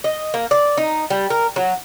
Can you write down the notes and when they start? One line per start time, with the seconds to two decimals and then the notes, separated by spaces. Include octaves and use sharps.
0.04 D#5
0.34 A#3
0.51 D5
0.77 D#4
1.10 G3
1.30 A#4
1.56 F#3